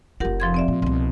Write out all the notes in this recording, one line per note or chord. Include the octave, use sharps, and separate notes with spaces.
F1 F4 G4 A#4 F#5
F3 C6 G#6
C4 D5 E5
A#2
C2 B2 C4